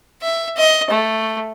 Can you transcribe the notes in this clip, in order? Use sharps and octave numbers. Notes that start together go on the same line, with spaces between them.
E5
D#5
A3